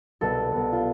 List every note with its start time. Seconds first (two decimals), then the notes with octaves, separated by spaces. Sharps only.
0.21 C2 B2 B3 A4
0.52 C2 B2 B3
0.72 F4